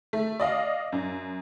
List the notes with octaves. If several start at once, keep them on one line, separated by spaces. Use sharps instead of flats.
A3
D5 D#5 F5
F#2